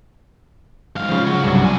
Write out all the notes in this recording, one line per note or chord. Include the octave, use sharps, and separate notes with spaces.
G#2 F5
C#3 F3
F#4 C#5
C2 G2 F#3 D4 F#4
F3 G#5